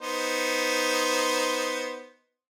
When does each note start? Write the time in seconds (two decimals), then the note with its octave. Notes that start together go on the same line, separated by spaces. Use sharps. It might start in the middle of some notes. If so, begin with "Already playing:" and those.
0.01 B3 D#4 C5